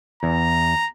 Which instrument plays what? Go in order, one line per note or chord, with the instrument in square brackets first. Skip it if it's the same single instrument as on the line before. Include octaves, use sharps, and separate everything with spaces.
[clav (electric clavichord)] E2 [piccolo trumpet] A#5